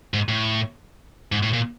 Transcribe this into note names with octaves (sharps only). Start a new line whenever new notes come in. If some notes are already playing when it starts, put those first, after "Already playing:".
G#2
A2
G#2
A2
A#2